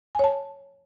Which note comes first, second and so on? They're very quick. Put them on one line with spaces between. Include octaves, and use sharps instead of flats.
G#5 C#5 A5